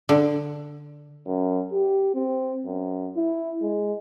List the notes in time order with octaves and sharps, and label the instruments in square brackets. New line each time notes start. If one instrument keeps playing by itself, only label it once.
[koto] D3
[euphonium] F#2
G4
C4
F#2
E4
G#3